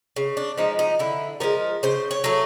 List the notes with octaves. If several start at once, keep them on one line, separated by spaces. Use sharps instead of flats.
C#3
D4
F3 G#3 D#4
D#4
D3 E4
F3 G#3 A#4
C#3 C5
C#5
F#3 A3